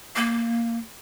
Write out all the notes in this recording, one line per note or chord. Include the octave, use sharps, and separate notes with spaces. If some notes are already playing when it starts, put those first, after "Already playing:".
A#3